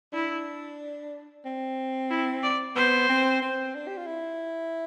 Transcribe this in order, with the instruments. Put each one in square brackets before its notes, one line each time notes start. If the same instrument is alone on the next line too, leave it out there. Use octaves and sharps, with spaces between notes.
[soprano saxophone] D4 [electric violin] E4
[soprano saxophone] C4
[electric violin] E4
D5
[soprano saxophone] B3 [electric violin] C5
[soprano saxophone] C4
C4
D4
G4
F4
E4